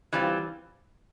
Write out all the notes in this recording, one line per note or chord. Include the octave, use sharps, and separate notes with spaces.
E3 G3 C4 F4